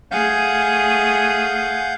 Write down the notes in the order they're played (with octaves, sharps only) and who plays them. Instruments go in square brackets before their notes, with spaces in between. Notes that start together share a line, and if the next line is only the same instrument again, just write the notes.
[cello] A3 G#4 [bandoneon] F5 F#5 G6